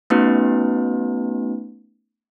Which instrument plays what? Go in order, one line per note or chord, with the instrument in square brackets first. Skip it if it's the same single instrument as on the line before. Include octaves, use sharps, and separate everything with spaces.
[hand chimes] A3 B3 C#4 D#4 F#4 B4